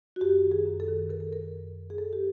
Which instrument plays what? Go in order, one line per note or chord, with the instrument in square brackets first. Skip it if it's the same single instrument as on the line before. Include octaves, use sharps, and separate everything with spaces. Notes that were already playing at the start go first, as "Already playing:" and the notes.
[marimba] F#4
F#2 G4
D#3
G#4
F#2
A4
D#3
D#3 A#4
A4
F#2 A#4
F#2
F#2
G#4
D#3 A4
G4